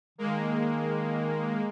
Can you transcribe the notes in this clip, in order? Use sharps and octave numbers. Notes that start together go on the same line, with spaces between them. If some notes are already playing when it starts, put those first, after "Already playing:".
D#3 G#3 A#3